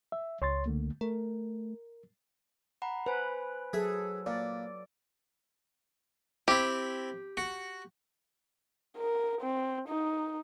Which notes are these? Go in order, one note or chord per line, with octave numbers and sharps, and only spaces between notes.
E5
C#2 C#5 C6 A6
D3 A3 A#3
A3 A#4
F#5 A#5 B5
B4 C5 G#5
F#3 G#4 A4 E5
A#2 D5
C4 E4 G4
F#4
A#4
C4
D#4